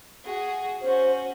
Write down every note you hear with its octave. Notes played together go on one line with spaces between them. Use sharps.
F#4 G#4
C#4 F#4 C5